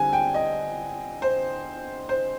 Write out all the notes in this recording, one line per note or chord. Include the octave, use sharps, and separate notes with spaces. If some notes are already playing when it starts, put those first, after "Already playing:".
Already playing: D3 G3 C4 G#5
G5
D#5
C5
C5